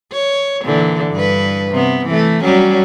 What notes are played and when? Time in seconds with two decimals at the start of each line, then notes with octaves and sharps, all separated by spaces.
0.12 C#5
0.65 A#2 D3 E3
1.12 G2 B4
1.71 C3 B3
2.06 E3 A3
2.43 F#3 G3 C#4